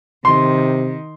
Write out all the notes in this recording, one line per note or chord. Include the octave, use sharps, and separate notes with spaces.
C3 D#3 C6